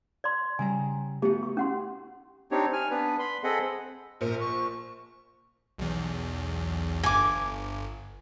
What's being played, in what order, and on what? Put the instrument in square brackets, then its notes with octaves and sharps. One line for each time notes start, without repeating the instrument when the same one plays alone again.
[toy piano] D5 C6
[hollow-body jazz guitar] C#3 G3 A#5 [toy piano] G#5
[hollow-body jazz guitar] A3 B3 F#4 [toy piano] G4
[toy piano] C#6
C#4 F#5 C6
[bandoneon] C4 D4 D#4 G4 C#5
G#5 F6
B3 D4 B4
B5 C6
C4 G#4 A4 D#5 F#5 B5
[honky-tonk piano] A#1 C5 C#7 [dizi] A#4
[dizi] C#6
[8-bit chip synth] B1 E2
[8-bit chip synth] G1 [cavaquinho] G#5 D6